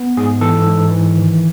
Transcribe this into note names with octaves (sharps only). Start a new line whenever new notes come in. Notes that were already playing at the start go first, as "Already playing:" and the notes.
Already playing: B3
G#2 G#4
E3 A4
G#2
E3
D#3